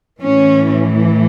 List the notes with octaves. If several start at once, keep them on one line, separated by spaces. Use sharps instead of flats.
A2 E3 C#4